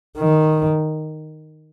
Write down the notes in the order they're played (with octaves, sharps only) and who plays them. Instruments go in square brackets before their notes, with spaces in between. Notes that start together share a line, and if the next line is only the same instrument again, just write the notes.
[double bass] D#3